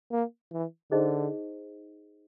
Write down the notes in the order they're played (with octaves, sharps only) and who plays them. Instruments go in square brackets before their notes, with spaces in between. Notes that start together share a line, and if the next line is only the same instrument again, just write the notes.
[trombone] A#3
E3
[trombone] D3 [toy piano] D#4 G#4 C5 D#5